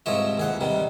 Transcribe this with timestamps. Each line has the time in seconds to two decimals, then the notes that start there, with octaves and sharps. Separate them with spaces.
0.06 C2 G#2 F3 C#5 D#5 E5
0.38 D#2 G#4 F#5
0.61 C3 D#3 G3